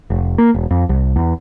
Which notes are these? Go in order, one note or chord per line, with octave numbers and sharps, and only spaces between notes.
F1
A#3
E1
F2
C2
E2